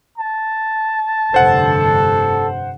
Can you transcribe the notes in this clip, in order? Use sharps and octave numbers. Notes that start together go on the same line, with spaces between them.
A5
F1 G2 D3 A4 C5 F#5